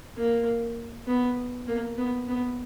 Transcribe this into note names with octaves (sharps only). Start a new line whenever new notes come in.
A#3
B3
A#3
B3
B3